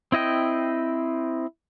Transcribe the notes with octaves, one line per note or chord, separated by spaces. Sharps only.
C4 E4 D#5 G5